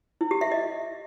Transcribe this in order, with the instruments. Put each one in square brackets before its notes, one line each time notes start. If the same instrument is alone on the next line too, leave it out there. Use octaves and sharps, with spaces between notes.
[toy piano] E4
G4
E5
D#5